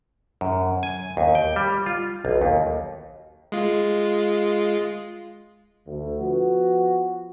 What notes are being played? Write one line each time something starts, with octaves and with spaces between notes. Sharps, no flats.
F#2
G#5
D#2
G5
G3
F4
B1
D#2
G#3 F4
D2
F3 B3 F#4